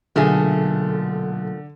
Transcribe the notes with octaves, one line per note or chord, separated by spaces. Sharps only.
B1 A#2 D3 A3 G#4